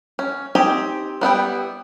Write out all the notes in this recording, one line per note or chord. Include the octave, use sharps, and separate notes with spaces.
C#4
C4 D#4 G4 G#5
G3 B3 E4 G5